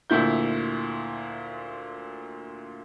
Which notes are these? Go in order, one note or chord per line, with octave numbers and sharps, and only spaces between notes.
D2 A#2 E4 G6